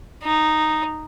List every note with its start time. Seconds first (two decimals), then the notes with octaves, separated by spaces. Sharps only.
0.24 D#4